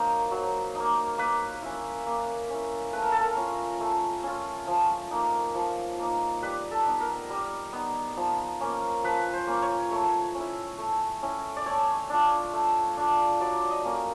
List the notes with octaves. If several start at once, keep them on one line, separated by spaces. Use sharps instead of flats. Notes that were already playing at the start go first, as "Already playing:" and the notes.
Already playing: F#3 A#3 D#4 C5
F#3
D#4
A#3
A#3 B4
C#4 E4
A#3
C#4 E4
A3 B4
A#4
A4
A#4
C#4 F4
A3
C#4 F4
F3
A#3 D#4
F3
A#3 D#4
G3 B4
A4
B3 D#4
A#4
G3
B3 D#4
F3
A#3 C#4
F3 B4
C5
A#3 C#4
C#5
A3 C#5
C#4
E4
A3
C#4 E4
D5
A3 C#5
D4 F4
A3
D4 F4
F#3 D5
D#5
A#3 C#4